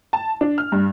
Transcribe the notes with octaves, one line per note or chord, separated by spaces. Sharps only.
A5
D4
F6
G2